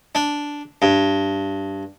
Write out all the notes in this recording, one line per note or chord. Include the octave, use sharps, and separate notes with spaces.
D4
G2